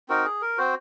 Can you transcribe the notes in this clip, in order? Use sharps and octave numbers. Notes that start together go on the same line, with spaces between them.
C4 D#4 F#4 A#4
G#4
A#4
C4 F#4 C5